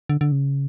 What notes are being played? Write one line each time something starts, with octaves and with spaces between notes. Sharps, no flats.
D3
D3
C#3